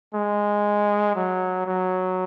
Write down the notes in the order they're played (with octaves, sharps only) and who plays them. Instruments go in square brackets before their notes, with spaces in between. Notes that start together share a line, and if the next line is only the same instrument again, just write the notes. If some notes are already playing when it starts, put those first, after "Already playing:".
[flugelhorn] G#3
F#3
F#3